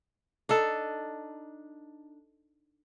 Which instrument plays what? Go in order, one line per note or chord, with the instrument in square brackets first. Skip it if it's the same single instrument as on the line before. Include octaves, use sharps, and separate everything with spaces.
[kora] D4 D#4 A4